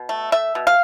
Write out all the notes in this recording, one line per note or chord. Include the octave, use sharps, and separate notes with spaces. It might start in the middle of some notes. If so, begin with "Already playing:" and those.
Already playing: B2
A3
A3 E5
B2
F5